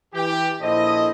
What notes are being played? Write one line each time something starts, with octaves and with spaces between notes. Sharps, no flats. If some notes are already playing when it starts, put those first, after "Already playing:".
E3 G4
A#1 E4 A4 C5 D#5